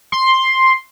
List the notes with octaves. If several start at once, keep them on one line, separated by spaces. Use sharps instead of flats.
C6